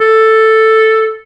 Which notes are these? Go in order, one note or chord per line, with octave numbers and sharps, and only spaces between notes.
A4